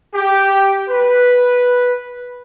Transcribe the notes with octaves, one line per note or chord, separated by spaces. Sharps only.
G4
B4